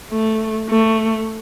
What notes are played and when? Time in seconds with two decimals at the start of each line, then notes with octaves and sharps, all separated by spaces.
0.11 A3
0.69 A3